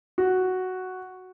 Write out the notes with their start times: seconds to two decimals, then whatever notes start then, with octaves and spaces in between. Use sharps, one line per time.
0.18 F#4